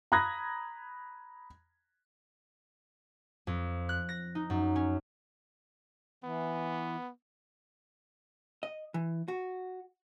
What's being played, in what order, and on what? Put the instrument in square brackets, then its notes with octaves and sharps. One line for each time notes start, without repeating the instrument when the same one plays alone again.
[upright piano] A#5 B5 D#6 F#6 G#6 A#6
[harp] F2
F#6
A#6
D#4
F#2
C#4
[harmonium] E3 [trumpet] B3
[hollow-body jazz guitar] D#5
E3
F#4